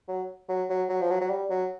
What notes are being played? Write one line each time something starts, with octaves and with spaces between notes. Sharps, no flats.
F#3
F#3
F#3
F#3
F3
F#3
F#3
G3
F#3